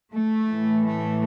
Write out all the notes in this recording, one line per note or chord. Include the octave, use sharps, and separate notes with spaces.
A3
A2 E3
A3